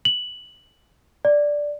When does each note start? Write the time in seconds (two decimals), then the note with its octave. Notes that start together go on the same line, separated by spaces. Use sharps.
0.05 F#7
1.25 D5